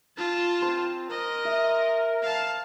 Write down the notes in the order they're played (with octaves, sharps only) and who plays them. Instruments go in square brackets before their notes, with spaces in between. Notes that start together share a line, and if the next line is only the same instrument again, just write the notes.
[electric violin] F4 A5
[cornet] C4 [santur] C5
[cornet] A#4 [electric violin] D#5
[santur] E5
[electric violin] F5 A5